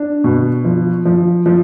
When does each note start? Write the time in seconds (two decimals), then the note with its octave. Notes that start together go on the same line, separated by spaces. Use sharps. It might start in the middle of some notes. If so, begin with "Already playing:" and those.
Already playing: D4
0.24 B2
0.65 F3
1.05 F3
1.46 F3